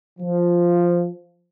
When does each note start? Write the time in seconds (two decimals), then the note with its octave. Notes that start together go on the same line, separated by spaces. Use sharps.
0.19 F3